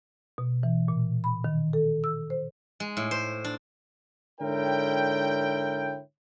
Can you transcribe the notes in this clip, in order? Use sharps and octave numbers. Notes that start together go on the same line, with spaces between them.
B2
E3
A#2
B5
D#3
A4
E6
C5
G#3
A2
C5
D4
G#2 D3 E4 A#4 C#5 G5